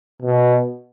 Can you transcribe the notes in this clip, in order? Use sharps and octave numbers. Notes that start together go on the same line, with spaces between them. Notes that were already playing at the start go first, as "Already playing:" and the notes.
B2